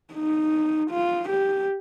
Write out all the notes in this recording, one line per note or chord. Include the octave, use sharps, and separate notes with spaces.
D#4
F4
G4